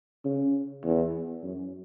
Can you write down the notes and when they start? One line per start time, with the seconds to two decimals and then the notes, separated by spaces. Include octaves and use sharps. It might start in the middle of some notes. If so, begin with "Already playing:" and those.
0.25 C#3
0.84 E2
1.43 F#2